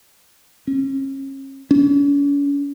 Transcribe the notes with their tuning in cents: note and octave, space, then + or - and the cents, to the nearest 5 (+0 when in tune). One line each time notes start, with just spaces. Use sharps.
C#4 -35
C#4 +45